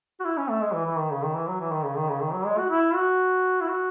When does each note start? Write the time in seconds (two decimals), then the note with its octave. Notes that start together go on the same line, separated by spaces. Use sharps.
0.20 F#4
0.25 E4
0.37 C#4
0.49 A3
0.62 G#3
0.73 E3
0.86 E3
0.98 D#3
1.11 C#3
1.23 D#3
1.35 E3
1.47 F#3
1.60 E3
1.72 D#3
1.84 C#3
1.97 D#3
2.09 C#3
2.21 D#3
2.33 F#3
2.45 G#3
2.58 F#4
2.70 E4
2.95 F#4
3.61 E4
3.68 F#4